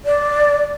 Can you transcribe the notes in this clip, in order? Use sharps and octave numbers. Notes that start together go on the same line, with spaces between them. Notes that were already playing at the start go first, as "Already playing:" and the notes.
D5